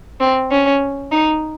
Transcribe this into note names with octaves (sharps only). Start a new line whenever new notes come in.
C4
C#4
D#4